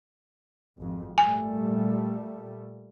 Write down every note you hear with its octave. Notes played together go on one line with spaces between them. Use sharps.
G#1 F2
A#2 G3 A3 G#5